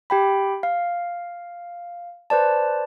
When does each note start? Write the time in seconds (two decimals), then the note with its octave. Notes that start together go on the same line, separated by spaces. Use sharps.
0.10 G4 G5 B5
0.63 F5
2.30 B4 C5 D5 A5